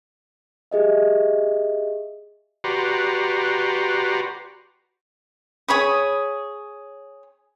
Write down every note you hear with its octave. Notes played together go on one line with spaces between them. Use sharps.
G4 G#4 D#5 E5
F#4 G4 B4 D5 A#5 C6
G#4 C#5 B5 D#6